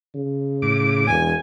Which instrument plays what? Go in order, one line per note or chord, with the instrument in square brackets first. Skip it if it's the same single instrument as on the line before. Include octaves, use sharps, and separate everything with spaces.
[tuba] C#3
[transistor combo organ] A2 D6
[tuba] E1 [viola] G#5